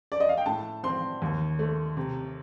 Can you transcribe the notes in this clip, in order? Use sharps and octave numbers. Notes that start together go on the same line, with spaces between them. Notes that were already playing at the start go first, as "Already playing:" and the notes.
D5
D#5
F5
G5
A2 A5
C4 C6
D#2
A3
C3